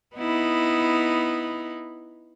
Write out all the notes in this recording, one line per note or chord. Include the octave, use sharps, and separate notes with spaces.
B3 D#4 E4